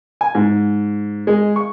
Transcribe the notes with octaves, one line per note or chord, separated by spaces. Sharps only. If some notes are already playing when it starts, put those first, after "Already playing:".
G#5
G#2
G#3
C#6